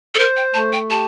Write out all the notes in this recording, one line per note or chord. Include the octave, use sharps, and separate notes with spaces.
A4
A#4 C5
G5
A3 A5
G5
G4 A5